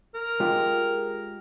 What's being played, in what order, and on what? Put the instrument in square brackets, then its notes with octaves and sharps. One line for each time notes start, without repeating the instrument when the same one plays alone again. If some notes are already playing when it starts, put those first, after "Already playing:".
[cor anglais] A#4
[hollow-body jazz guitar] G#3 F4 G4